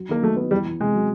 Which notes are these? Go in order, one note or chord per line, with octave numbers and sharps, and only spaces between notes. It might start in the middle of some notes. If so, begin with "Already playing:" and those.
Already playing: F#3
D#3 A#3
F#3 A3
B3
E2 G3
E2
C3 G#3
F#3